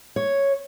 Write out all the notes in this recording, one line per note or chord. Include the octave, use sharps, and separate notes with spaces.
C#5